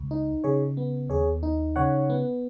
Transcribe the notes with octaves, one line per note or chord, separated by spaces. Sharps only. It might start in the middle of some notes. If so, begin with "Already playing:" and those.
Already playing: C#2
D#4
C#3 G#4 C#5
B3
D#2 G#4 C#5
D#4
C#3 C#5 F#5
B3